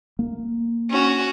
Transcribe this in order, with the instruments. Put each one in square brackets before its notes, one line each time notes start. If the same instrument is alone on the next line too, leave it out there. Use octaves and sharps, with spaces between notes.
[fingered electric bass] A#3
[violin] C#4 F#4